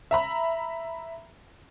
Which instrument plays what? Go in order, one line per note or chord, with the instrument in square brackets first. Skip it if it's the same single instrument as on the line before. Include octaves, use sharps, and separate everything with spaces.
[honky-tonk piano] E5 A#5 B5